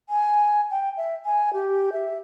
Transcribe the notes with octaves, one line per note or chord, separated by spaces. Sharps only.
G#5
G5
E5
G#5
G4
E5